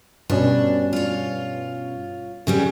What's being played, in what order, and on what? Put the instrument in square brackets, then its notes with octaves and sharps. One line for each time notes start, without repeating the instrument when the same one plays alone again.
[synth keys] G2 B2 C#4 [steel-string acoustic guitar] D4
[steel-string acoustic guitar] F4 C#5
C#3 G3 B3